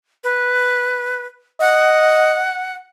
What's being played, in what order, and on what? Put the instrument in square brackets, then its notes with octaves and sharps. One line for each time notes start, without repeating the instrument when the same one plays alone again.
[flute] B4
[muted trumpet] D#5 [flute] F#5